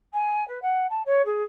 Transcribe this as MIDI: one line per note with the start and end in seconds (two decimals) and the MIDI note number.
0.13 0.46 80
0.47 0.60 71
0.62 0.86 78
0.89 1.02 81
1.05 1.25 73
1.25 1.42 68